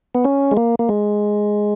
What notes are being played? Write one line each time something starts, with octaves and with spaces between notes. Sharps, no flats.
B3
C#4
G#3
A#3
A#3
G#3